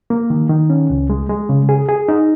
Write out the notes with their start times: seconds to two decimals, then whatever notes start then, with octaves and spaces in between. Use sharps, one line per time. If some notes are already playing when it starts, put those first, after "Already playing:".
0.10 A#3
0.30 D#3
0.49 D#3
0.70 C#4
0.90 C#2
1.10 G#3
1.29 G#3
1.49 C#3
1.69 G#4
1.88 G#4
2.08 D#4